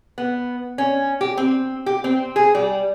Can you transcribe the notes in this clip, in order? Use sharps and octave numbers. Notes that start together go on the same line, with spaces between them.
B3
C#4
G4
C4
G4
C4
G#4
G3